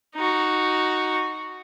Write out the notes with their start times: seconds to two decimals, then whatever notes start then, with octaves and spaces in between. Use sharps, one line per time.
0.15 D#4 F#4